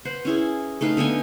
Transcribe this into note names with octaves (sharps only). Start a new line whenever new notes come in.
B4 C5 F#5
C#4 E4 G#4
A3 D#4 B4 F5
D3 B3 D#4 G#5